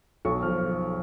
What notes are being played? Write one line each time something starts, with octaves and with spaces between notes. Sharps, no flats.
B1 C#6
F3 F6